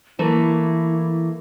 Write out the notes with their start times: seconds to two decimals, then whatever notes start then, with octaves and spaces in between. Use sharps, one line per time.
0.19 E3 A3 A#3 E4